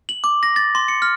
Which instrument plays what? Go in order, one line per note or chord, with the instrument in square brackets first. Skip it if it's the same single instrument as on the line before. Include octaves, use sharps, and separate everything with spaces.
[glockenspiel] F#7
D6
A#6
A6
C6
C#7
F6